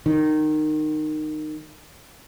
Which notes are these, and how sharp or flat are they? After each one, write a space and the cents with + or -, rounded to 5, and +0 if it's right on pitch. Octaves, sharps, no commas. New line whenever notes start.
D#3 -20